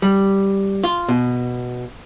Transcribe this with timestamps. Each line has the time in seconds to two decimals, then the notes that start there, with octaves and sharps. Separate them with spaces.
0.02 G3
0.84 F4
1.09 B2